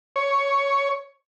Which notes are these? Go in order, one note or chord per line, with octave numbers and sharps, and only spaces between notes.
C#5